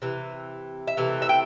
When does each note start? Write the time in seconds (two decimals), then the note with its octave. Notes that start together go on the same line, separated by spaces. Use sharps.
0.02 C3 E3
0.88 E5
0.97 C3 E3 A3
1.22 E5
1.29 G5